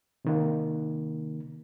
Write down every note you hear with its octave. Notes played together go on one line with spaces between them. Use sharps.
C3 D#3 A#3